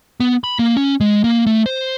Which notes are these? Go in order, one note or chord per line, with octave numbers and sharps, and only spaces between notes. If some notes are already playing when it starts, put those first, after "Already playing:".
B3
B5
A#3
C#4
G#3
A#3
A3
C5